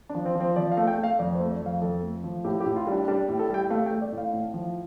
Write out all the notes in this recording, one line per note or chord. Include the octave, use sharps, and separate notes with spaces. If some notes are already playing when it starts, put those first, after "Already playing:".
D4
F3
C4
F3
C4
F3 D5
F5
A3
G5
A3
F5
F2 D5
C5
A3
D5
F2
F5
F2 A4
A3
F3
A2 G4
G4
A2
F4
G3 D4
G3 D4
A2
A4
G3 G5
A3 F5
G5
A3
D5
A2
F5
A2
F3